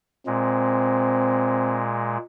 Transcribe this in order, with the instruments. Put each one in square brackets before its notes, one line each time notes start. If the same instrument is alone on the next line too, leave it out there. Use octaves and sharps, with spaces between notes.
[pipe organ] A#2 G#3 [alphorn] C4